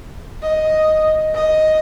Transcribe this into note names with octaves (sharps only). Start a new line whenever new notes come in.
D#5
D#5